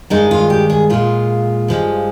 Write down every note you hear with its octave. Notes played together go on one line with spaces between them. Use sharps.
G2 D#3 G#3 D#4
F4
G4
G#4
A#2 G#3 F4
G2 F3 G#3